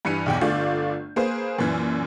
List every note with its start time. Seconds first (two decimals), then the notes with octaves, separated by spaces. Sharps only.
0.05 G2 E3 C#7 D#7
0.26 B1 E2 G5
0.41 G1 A3 F4 D5 G6
1.16 A#3 G#4 B4 C5
1.58 F#2 A#2 E3